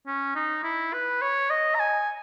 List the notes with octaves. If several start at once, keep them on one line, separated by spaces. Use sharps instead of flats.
C#4
D#4
E4
B4
C#5
D#5
A#5
G#5